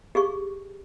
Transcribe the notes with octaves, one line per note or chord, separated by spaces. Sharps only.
G4 G#4 C#6